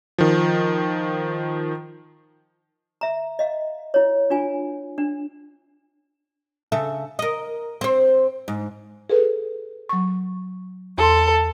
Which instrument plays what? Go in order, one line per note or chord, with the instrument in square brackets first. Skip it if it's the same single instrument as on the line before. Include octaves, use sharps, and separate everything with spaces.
[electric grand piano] D#3 F3
[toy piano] E5 A#5
D#5 F5
E4 C#5
D4 F4 G#5
D4
[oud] C#3 A4 E5
A#4 D#5
C4 C5
G#2
[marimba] G#4 A4 B4
F#3 C#6
[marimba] E2 C6 [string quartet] A4